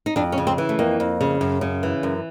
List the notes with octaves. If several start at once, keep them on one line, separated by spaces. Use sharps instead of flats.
D#4
F2 D4
C#4
C#3
C4
E3
A3
F2 A#3
F2
C#3
F#2
C#3
E3
F#2